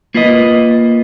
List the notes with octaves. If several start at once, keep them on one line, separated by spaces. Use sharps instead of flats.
A#3 F4 B4 D#5